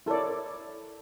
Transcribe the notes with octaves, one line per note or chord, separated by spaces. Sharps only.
E4 A4 A#4 C#5 D5